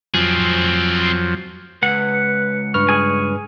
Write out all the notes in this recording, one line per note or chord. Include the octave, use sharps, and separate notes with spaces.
F2 F3 F#3 C4 G#4
C#2 B4 F#5
G2 B4 C#6 F6
G#4 G#5